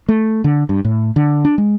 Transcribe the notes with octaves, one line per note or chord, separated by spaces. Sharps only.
A3
D3
G2
A2
D3
D4
G#3